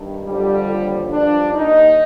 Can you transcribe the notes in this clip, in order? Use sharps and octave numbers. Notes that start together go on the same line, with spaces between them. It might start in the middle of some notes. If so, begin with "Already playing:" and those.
Already playing: G2 D#3
F2 D3 F3 G3
D#2 D3 F3
G2 F3 D4
D#2 D#3 D#4